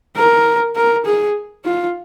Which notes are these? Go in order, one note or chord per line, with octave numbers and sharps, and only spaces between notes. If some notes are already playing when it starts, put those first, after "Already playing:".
A#4
A#4
G#4
F4